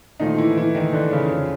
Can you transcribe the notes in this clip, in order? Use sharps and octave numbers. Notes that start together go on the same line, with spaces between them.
A#2 D#3 F3 A3 D#4
E3 E4
E3 E4
D#3 D#4
D3 D4
C#3 C#4
F2 D3 F3